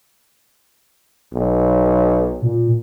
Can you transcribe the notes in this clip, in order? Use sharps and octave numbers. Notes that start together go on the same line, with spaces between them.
B1
A#2